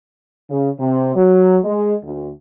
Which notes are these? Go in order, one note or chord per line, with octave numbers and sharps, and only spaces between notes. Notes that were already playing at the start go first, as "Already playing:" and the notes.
C#3
C3
F#3
G#3
D2